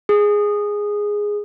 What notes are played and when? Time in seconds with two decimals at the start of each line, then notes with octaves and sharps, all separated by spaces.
0.09 G#4